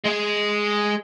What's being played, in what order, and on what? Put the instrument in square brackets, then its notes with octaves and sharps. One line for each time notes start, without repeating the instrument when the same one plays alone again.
[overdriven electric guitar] G#3 G#4